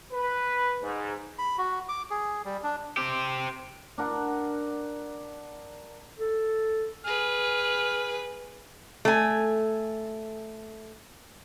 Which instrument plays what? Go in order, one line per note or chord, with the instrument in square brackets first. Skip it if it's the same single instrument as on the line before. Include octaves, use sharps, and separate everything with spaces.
[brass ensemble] B4
G#2
[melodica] B5
F#4
D6
G#4
G3
D4
[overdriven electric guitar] C4 G4
[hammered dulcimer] D4 A#4 F#5
[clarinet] A4
[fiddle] G#4 B4 [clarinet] F6
[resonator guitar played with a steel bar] A3 G#5